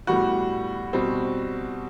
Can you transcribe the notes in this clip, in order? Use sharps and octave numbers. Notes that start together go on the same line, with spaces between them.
A2 G3 B3 F#4
B2 G3 C4